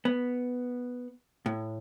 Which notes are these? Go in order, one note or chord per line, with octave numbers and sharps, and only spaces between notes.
B3
A2